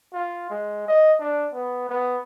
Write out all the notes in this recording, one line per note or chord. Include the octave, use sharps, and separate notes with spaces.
F4
G#3
D#5
D4
B3
B3